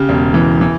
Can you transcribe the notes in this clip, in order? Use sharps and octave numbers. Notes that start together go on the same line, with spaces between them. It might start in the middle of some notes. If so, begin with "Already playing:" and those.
Already playing: C#3 G4
E1
E3
E3